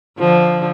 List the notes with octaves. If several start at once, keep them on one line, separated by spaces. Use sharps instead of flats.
D3 F3